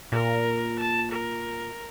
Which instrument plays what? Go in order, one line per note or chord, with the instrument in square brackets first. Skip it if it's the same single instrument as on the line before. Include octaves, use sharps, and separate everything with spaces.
[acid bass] A#2 [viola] A#4
[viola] A5
A#4